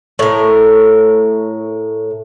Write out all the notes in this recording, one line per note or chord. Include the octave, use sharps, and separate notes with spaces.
A2 A#4